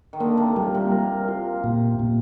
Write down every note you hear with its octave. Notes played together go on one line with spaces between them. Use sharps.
D#3
D3 A#3
C3
A#2 G3
C3
A#4
F4
A#2
A#2